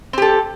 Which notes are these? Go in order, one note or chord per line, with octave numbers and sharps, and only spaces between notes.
C4 G4 A4